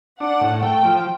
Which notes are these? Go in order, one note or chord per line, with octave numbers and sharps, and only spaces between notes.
D4 F#5
A2
A3 G5
F3